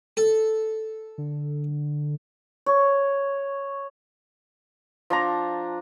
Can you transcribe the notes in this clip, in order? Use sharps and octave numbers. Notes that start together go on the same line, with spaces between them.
A4
D3
C#5
F3 D4 A#5